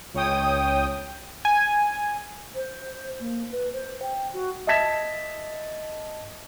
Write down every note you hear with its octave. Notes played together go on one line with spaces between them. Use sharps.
C#2 C#5 G5 D#6
G#5
C5
A#3
B4
C5
G5
F#4
D#5 E5 A5 G#6 B6 E7